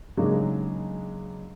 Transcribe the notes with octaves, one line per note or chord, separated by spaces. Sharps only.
C#3 F#3 G#3 A#3 D4 D#4